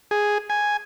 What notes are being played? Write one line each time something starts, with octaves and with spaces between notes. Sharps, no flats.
G#4
G#5